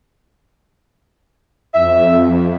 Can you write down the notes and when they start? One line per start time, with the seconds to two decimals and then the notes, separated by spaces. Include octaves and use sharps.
1.74 F2 E5